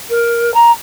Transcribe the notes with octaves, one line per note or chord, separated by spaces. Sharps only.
A#4
A#5